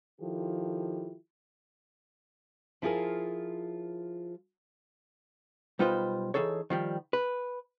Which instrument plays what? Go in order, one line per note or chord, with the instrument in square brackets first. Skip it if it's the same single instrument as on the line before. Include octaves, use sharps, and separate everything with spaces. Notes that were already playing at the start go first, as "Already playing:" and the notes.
[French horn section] D#3 F3 E4 F4 G4 A4
[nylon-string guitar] F3 E4 F4 G4 G#4 A#4
[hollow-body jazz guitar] B1 G3 D#4 F4 B4 C5
E3 D#4 G#4 A4 C#5
D#3 F3 G3
B4